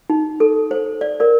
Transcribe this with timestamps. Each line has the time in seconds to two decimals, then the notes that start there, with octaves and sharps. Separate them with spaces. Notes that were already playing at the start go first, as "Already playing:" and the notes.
0.10 D#4
0.40 A4
0.71 C5
1.01 D5
1.20 A#4 D5